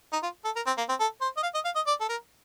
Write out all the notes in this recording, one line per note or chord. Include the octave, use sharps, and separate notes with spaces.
D#4
F4
A4
A#4
C4
A#3
C4
A4
C5
D#5
F5
D#5
F5
D#5
D5
A4
A#4